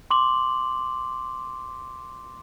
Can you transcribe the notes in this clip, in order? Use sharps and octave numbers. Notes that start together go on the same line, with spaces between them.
C6 D6 F#7